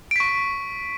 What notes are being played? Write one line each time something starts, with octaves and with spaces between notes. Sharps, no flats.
C#6 B6 D7